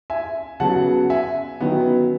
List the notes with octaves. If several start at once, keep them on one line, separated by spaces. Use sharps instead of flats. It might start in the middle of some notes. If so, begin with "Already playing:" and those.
E5 G#5
C#3 F#3 B3 F#5 A5
E5 G#5
D#3 F#3 B3